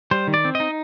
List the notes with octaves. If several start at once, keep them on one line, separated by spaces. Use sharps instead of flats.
G3 C5
D#3
D5
C4
D#5
D#4